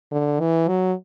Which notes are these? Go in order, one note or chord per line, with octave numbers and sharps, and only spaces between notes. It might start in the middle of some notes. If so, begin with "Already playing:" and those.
D3
E3
F#3